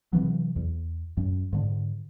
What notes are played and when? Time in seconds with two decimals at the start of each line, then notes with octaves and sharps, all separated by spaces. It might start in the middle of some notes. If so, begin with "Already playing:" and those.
0.13 C3 E3 F#3
0.56 E2
1.17 F#2
1.53 G#2 D3